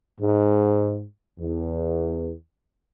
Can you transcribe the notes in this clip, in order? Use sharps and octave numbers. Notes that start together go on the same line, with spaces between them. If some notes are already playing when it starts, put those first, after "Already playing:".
G#2
E2